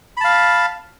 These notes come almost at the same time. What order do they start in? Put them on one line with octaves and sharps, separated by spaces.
B5 A5 F5